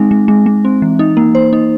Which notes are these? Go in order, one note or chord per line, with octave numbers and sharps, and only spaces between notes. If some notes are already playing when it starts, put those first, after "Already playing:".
Already playing: G#3 C4 D#4
G#3
G#3
G#3
C4
E3
D#4
A#3
C5
D#4